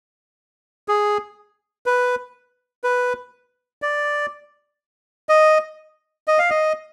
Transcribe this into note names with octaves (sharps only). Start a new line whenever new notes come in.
G#4
B4
B4
D5
D#5
D#5
F5
D#5